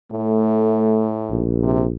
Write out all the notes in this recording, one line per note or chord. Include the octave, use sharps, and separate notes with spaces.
A2 A3
A#1
C3